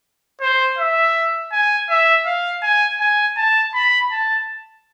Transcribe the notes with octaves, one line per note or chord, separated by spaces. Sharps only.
C5
E5
G#5
E5
F5
G#5
G#5
A5
B5
A5